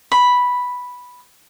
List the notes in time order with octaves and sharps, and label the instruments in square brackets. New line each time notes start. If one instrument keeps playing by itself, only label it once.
[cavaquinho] B5